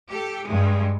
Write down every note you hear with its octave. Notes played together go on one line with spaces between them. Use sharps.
G4 A4
G2 G#3